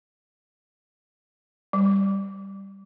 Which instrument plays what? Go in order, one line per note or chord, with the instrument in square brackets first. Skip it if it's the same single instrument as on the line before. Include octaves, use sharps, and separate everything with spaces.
[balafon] G3